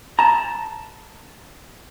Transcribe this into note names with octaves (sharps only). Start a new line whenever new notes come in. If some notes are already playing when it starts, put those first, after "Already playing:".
A5 A#5